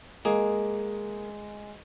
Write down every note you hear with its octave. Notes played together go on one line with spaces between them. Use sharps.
G#3 A#3 G#4